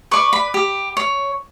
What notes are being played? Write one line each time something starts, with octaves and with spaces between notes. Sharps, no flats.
B4 D5 C#6
B5
G4
C#5